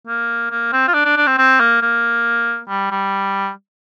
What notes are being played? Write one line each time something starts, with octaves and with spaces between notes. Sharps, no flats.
A#3
A#3
C4
F4
D4
D4
D4
C4
C4
A#3
A#3
G3
G3